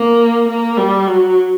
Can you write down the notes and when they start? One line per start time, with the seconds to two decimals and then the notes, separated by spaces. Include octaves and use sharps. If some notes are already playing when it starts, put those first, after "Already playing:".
Already playing: A#3
0.48 A#3
0.78 G3
1.07 F#3